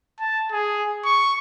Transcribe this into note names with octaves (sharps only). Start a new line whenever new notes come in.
A5
G#4
C#6